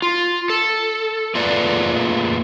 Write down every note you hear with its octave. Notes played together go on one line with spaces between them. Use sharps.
F4
A4
A3 A#3 F4 G#4 B4 D5